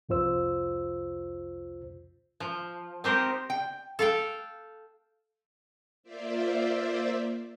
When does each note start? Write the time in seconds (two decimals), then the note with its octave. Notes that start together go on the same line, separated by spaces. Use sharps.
0.09 C2 F2 F4 C5 E6
2.40 F3
3.04 C4 D#4 G4 A#4 C5
3.50 G5
3.99 A4 F5 G5
6.03 A#3 F4 C5 D5 E5